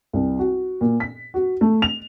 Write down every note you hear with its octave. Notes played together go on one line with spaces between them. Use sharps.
C2
F#4
A#2
B6
F#4
A3
F7